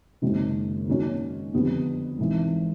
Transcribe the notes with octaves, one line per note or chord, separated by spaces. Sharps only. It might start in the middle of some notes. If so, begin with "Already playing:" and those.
F#1 F#2 D#3 G#3 C4
G#2 D#3 F#3 A#3 C#4
F2 D3 G3 B3
G#1 G#2 E3